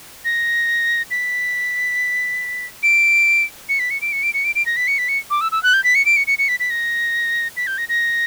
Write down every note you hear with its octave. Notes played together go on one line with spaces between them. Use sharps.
A#6
B6
D7
C#7
B6
C#7
D7
C#7
D7
C#7
D7
D7
A#6
B6
C#7
B6
C#7
D6
E6
E6
F#6
G6
B6
C#7
D7
C#7
C#7
C#7
B6
B6
A#6
B6
G6
A#6
A#6